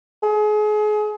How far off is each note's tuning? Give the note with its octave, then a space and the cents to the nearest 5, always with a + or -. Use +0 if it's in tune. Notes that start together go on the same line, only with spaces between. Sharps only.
G#4 +35